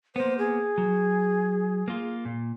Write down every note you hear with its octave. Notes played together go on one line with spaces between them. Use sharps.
A#3 B3 C5
G#4
F#3
A#3 F4
A#2